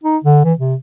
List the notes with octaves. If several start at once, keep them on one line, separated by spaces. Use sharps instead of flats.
D#4
D3
E3
C3